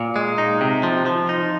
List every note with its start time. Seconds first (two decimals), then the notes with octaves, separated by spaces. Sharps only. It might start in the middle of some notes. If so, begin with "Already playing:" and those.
Already playing: A#2
0.16 G#3
0.38 D#4
0.61 C3
0.83 F3
1.06 F3
1.29 D#4